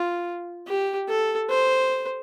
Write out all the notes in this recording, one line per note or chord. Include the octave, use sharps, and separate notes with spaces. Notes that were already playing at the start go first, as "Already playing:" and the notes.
Already playing: F4
G4
A4
C5